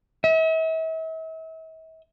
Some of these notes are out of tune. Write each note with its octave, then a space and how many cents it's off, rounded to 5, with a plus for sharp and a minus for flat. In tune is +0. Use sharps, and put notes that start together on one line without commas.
E5 -40